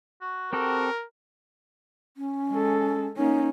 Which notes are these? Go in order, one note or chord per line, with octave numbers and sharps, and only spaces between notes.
F#4
C4 F#4 G4 A4 A#4
C#4
G#3 A4
A#3 C#4 D#4